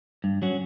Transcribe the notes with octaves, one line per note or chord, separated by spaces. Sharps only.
G2
F#3 C#4 F#4